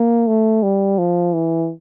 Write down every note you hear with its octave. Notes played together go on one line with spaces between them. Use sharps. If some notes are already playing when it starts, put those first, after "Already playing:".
Already playing: A#3
A3
G3
F3
E3